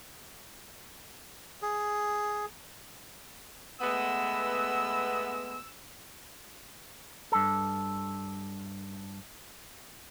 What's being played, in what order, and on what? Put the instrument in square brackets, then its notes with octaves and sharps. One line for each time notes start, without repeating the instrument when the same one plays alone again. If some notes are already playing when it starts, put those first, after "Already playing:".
[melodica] G#4
[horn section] G#3 A3 B3 [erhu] E6
[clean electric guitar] G2 A4